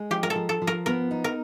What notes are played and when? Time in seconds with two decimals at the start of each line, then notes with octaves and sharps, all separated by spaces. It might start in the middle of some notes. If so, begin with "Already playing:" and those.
Already playing: G#3
0.10 F3 G4
0.23 A#4
0.30 A4
0.36 F3
0.49 A4
0.62 F3
0.67 A#4
0.86 B3 A#4
1.11 D#4
1.24 A#4